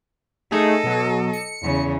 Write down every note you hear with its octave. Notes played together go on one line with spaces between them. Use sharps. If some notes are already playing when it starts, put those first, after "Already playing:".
A3 D#4 G#4 A4 D#5
B2 F#3
C#7
E2 C#3